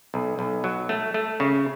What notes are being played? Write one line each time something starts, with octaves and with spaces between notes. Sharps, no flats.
B1
B1
F#3
A3
A3
C#3